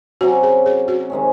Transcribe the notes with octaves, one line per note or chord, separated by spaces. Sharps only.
C3 F#3 C#4 F#4
G#4
G#4
F#4
C3 D#3 G#3 C#4